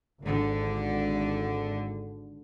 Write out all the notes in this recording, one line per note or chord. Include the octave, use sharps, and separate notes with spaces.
G#1 D3